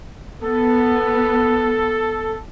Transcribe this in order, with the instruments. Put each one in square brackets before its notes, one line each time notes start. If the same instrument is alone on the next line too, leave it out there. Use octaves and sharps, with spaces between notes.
[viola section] B3 [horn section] A4